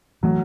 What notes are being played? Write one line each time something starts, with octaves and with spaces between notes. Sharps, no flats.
E3 F#3 A3